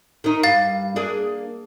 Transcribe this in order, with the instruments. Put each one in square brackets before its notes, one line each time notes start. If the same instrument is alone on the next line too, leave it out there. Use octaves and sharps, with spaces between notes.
[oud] D#3 D#4
[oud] G2 [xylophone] F5 A6
[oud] A#3 D4 G#4